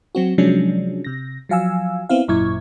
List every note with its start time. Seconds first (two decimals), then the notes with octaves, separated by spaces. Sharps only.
0.15 F#3 C4 F#4
0.38 C3 F3 F#3 G#3 C#4 D4
1.05 C3 A#6
1.49 F3 F#3 F5 G#5 E6
2.09 B3 C4 E4 F5
2.28 G#1 F#2 A#2 E4 C#6 G#6